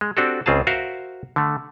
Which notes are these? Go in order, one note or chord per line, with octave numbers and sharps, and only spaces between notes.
G#3
C4 D4 F#4 G4 A4
C#2 C#3 C4 F4 G#4 A5
F#4 A#4 C5 E5 F5
D3 A3